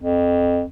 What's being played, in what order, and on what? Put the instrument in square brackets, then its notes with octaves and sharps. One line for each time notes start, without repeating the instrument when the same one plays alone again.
[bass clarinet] F2